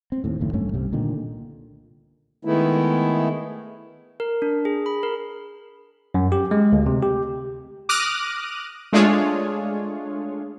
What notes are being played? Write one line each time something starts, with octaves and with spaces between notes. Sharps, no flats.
C4
D#2 A2
F#1 D#2 A2
A1 G2 A3 C#4
C2 C3
A#2 D3 D#3
D#3 G#3 A3 B3 E4
A#4
D4
G#4
B5
A#4
F#2
G4
G#3
D2
C3
G4
D6 D#6 F6 F#6 A#6 D#7
G#3 A3 D4 F4 G#4 C#5